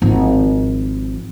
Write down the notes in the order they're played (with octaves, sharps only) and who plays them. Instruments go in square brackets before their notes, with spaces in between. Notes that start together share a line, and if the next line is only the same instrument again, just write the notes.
[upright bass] G#1 F3